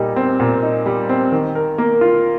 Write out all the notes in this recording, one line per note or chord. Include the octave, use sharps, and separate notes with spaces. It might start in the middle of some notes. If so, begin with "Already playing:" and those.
Already playing: A#2 G3 D#4
C4
A#2
D#4
G3
C4
D#3
A#4
A#3
F4